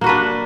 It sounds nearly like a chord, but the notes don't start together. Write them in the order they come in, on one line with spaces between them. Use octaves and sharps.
A#3 F#4 B4 D4